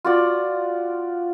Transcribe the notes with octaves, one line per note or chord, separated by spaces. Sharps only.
F4 F#4 D5